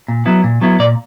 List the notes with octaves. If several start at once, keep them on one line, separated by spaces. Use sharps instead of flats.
A#2
F#3 B3 E4
A#2
F#3 B3 E4
A#2 D5